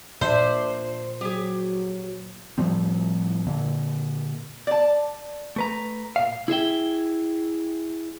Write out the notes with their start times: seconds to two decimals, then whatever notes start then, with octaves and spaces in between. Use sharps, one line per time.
0.21 A#2 D4 C5 E5
1.21 F#3 G4 G#4
2.58 A2 F3 G3 C4
3.47 A#2 D3 A#3
4.67 D5 A5
5.56 A3 B4 A#5
6.16 A#2 F5
6.48 E4 G#4 E5 G5